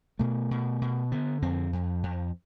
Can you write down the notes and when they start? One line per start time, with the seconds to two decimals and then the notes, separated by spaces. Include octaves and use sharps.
0.19 B2 A3
0.51 B2
0.81 B2
1.12 D3 B3
1.42 F2 C4
1.73 F2
2.03 F2